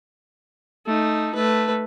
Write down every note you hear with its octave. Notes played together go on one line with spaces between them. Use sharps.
A3 D#4
A3 B4